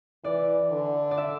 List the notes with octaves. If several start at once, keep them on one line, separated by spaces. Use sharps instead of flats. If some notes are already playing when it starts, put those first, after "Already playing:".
E3 D5
D3
D5
E5